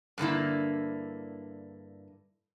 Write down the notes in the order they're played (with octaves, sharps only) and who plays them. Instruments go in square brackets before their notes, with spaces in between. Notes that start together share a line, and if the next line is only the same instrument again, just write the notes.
[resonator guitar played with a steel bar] G2 D3 A#3 E4